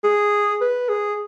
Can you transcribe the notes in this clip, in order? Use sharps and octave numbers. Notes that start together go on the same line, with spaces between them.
G#4
B4
G#4